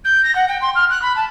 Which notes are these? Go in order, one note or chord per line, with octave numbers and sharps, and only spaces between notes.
G6
A#6
F#5
G5
C6
F6
F#6
B5
A5